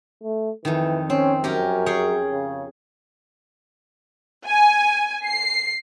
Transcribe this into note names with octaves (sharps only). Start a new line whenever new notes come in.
A3
F2 D#3 E3
C4 C#4
F#2 C#4 G4 A#4
G#4 C#5 G5
C#3
G#5
C7